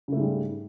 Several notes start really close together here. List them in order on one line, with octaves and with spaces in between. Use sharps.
C#3 A3 G#2 G3